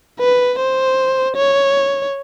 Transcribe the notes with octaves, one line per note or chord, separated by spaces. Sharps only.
B4
C5
C#5